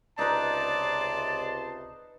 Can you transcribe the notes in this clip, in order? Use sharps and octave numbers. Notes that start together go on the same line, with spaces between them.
C#2 C3 D#4 B4 D5 A5 C6